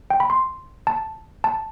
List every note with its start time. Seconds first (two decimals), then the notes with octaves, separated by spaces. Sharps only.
0.10 G5
0.20 B5
0.30 C6
0.87 A5
1.44 A5